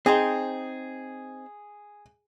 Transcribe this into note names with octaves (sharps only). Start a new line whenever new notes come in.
C4 D#4 G#4 C5